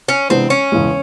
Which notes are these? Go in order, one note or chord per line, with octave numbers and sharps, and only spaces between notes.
C#4
C3 E3 G#3 B3 C4 D4
C#4
E1 E2 C#3 E3 G#3